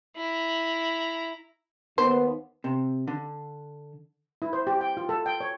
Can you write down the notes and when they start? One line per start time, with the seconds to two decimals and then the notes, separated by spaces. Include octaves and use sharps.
0.17 E4 A#5
1.98 D#2 B3 C5
2.64 C3
3.08 D3
4.42 E4
4.53 C5
4.67 G4
4.81 G5
4.97 F4
5.09 A4
5.26 G5
5.41 C#5